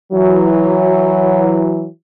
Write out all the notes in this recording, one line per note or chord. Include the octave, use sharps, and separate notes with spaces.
E3 F#3